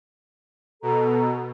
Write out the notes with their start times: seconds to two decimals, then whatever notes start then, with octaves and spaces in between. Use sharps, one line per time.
0.83 B2 A4 A#5